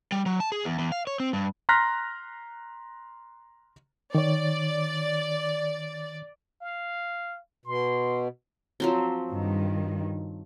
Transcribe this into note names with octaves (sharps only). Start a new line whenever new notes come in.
G3
F#3
A5
G#4
E2
E2
F5
C#5
C4
G2
A#5 C6 F6 F#6 A#6 B6
D#3 C#5 D5
F5
B2 C6
F3 F#3 C4
G2 D#3